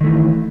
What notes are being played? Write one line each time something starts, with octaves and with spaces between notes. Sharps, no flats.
D#3 E3 A3